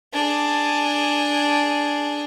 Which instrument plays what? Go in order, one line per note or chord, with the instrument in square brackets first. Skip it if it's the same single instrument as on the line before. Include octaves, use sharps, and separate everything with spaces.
[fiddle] D4 G#4